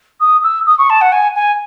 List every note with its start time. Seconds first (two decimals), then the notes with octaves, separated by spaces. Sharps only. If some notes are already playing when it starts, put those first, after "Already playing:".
0.20 D#6
0.43 E6
0.66 D#6
0.78 C#6
0.90 A5
1.01 F#5
1.12 G#5
1.35 G#5